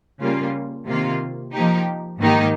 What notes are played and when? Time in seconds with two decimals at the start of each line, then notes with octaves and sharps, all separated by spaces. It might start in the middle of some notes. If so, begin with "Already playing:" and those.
0.20 C#3 G3 A#3 F4
0.87 C3 D#3 A#3 F4
1.54 F3 A#3 D#4 G4
2.20 G#2 D#3 A#3 D#4 G4